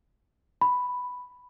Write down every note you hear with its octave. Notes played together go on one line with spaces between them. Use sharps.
B5